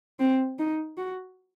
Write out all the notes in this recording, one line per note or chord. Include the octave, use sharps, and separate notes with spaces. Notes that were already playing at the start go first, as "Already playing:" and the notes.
C4
D#4
F#4